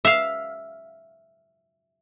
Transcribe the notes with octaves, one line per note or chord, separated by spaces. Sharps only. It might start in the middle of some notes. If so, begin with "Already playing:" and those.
E5 F5